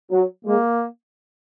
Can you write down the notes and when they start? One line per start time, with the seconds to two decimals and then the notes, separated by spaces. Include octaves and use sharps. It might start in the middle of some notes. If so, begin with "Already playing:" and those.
0.11 F#3
0.45 G#3 A#3